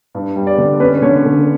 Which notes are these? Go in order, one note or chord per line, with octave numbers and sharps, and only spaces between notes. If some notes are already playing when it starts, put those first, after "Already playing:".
G2
G3
D5
D3
C#4 B4
D3 C#5
D3